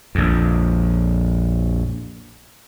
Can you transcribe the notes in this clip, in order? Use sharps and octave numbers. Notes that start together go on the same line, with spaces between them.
A#1 F2